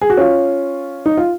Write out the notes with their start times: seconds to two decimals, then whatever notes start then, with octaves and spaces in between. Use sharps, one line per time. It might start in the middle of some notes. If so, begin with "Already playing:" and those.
0.01 G#4
0.10 F#4
0.17 C#4 F4
1.06 D#4
1.17 F4